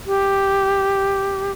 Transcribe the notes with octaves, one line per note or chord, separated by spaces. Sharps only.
G4